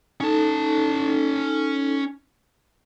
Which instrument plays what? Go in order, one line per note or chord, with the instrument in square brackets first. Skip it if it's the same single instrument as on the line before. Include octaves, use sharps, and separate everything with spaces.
[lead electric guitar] C#4 A5 [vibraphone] D#4 A4